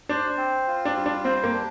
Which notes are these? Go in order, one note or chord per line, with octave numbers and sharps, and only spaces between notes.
D4 C5
C4
F4
D4
G3
D4
C4 C5
A#3
D4